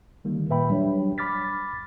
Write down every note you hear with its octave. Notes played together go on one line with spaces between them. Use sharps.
D3 D#3 G3 A#3
A#2 B4 E5 G5 B5
F#3 G3 D4 C#5
B5 D6 F6 A6 B6